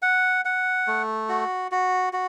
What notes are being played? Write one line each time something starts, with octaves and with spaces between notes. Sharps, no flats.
F#5
F#5
A3
F#4
F#4
F#4